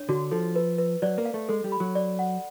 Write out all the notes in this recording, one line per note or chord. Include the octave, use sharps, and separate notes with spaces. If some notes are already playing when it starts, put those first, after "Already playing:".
Already playing: D4 C#5
D3 F#4
F3 A4
B4
B4
F#3 D5
A#3
F5
A3
G#3 A4
G3
B5
F#3
D5
F#5